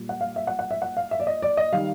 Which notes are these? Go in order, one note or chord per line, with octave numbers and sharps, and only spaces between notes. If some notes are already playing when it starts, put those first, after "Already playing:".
Already playing: A#2 G3 A#3
F#5
F5
E5
F#5
F#5
E5
F#5
F5
E5
D5
D#5
D5
D#5
D#3 G3 F5